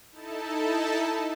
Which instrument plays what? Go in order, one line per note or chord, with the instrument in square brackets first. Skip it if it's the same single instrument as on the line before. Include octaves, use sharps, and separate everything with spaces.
[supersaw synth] D#4 E4 A4 A5